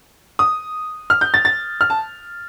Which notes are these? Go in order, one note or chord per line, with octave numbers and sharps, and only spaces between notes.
D#6
F6
G6
A6
A6
F6
A5